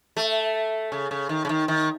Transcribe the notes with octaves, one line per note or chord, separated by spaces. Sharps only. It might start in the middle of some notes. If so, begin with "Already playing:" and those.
A3
C#3
C#3
D#3
C#3
D#3
D#3